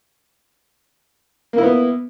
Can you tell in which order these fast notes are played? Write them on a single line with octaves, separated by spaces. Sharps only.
A#3 E4 B3